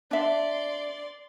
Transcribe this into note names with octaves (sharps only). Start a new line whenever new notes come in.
D4 D5 E5 C6